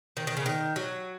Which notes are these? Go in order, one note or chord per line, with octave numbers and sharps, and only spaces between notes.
D#3
D#3
C#3
D#3
F#3